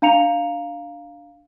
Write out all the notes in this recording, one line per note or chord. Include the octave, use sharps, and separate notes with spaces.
D4 F5 A#5 C#7 F7